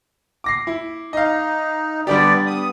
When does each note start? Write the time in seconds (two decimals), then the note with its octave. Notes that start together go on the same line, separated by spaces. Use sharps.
0.44 D6 A#6 C7
0.67 E4
1.13 D#4 D#5 F5
2.07 D3 G3 B3 D4 G4 D5
2.47 B3 D#6